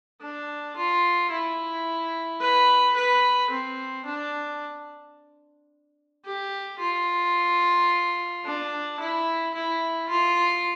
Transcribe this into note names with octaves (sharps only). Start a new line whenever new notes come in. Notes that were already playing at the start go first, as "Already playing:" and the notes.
D4
F4
E4
B4
B4
C4
D4
G4
F4
D4
E4
E4
F4